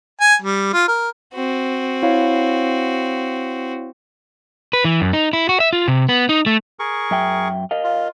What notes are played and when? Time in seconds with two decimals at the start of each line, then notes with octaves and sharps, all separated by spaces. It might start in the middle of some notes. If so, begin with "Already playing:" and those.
0.21 G#5
0.42 G3
0.73 F4
0.88 A#4
1.34 C4 F#4
2.03 E4 C#5 F5
4.73 B4
4.85 E3
5.01 F#2
5.13 D#4
5.33 E4
5.49 F#4
5.60 E5
5.73 F4
5.88 C3
6.09 B3
6.29 D#4
6.46 A3
6.79 G#4 A#4 C#6
7.11 F#2 E5 G5
7.71 A#4 D#5 F5
7.84 F4